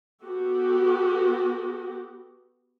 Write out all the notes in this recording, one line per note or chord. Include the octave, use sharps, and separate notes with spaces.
B3 F#4 G4 A4